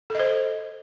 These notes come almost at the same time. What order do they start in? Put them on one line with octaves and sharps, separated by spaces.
A4 D#5 C5